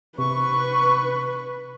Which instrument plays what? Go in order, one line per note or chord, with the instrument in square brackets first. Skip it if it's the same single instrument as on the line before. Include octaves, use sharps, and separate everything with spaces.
[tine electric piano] C3 [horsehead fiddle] B4 [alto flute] C#6